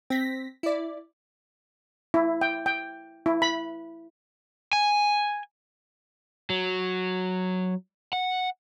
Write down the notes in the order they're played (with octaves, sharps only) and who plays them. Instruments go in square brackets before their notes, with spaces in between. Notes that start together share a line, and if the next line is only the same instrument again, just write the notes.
[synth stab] C4 A#6 B6
E4 D5
[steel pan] E4
G5
G5
E4
B5
[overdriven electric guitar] G#5
[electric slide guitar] F#3
F#5